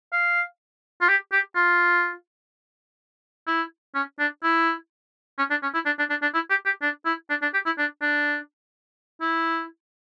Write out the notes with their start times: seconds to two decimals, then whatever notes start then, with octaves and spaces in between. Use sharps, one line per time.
0.12 F5
1.01 F4
1.08 G4
1.32 G4
1.55 F4
3.47 E4
3.95 C#4
4.19 D4
4.43 E4
5.38 C#4
5.50 D4
5.63 C#4
5.74 E4
5.86 D4
5.99 D4
6.10 D4
6.22 D4
6.34 E4
6.50 G4
6.65 G4
6.82 D4
7.05 E4
7.30 D4
7.42 D4
7.53 G4
7.66 E4
7.78 D4
8.01 D4
9.21 E4